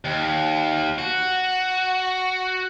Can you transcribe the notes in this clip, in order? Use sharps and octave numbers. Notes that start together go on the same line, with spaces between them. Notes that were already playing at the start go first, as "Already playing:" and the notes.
D#2
F#4